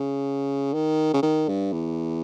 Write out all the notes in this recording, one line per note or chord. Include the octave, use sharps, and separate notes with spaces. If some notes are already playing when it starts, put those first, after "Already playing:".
Already playing: C#3
D#3
C#3
D#3
G2
E2